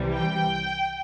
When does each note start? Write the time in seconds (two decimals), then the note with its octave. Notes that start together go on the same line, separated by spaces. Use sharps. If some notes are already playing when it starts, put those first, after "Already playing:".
Already playing: C2 C3 E3 G3
0.16 G5